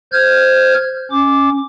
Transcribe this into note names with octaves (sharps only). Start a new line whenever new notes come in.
C5 F6 G6 G#6
C#4 D6